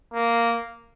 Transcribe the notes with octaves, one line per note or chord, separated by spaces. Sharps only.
A#3